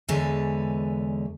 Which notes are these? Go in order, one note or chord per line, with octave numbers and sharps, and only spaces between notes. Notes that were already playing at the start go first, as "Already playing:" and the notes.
E2 D3 G#3 B4 C#5